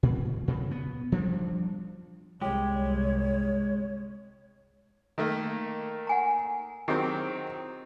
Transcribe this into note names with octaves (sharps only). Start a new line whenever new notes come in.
A#2
A#2 C#3
B3
F3 G3 D4
G1 C2 G3 G#3 G4 C#5
D#3 A3 A#3
F#5 G#5 A#5
D#3 F#3 C4 E4 G4 G#4